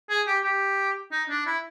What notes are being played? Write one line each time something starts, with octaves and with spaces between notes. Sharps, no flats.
G#4
G4
G4
D#4
D4
E4